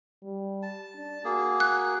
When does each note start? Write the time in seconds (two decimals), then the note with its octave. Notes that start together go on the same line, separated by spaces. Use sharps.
0.23 G3
0.63 A5
0.94 D4
1.25 A#3 F#4 G#4
1.60 F#6